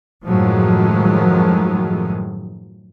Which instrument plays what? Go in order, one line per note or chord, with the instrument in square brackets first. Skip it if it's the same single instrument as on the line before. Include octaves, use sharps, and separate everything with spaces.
[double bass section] F#2 A2 D#3 F3 F#3 G#3